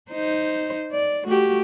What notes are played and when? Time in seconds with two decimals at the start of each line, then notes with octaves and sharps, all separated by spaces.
0.11 D#4 C5
0.92 D5
1.25 A3 F#4 G4